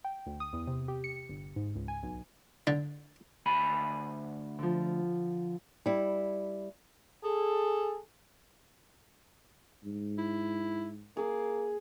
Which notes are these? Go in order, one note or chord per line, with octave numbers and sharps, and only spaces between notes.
G5
D2
D#6
E2
C3
G4
C#7
G1
G#2
C#2
G#5
B1
D3
D2 G#5 B5
D3 F3
G3 E4
G#4 A4
G#2
E4
A#3 G#4